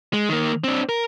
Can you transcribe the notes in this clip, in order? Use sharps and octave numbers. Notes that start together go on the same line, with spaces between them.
G#3
D#3 A#3
C4 D4
A#4